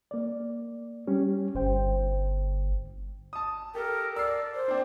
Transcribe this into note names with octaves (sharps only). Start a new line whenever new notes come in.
A#3 D5
G3 C#4 G4
G1 G2 C5 G5
A5 D#6
G4 A4 A#4
D5 E6 C7
C5
C4 D4